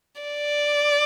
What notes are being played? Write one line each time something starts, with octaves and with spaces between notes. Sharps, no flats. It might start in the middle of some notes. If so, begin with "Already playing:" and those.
D5